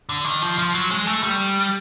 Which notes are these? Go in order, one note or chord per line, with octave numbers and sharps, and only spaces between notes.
D3
D#3
F3
F3
F#3
G#3
A3
G3